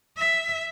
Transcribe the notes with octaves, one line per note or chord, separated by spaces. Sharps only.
E5